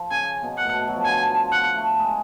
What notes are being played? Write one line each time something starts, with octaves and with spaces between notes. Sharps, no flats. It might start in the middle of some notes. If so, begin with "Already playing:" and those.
Already playing: F3
C#3 G#5
B2
F#5
A2
B2
F#3
F3
D3 G#5
F3
F#5
A3
G#3